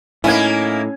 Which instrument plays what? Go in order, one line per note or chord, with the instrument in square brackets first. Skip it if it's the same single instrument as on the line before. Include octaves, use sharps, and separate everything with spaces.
[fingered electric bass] A2 [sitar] A#3 D#4 E4 [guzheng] C#4 [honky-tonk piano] G#5 G#6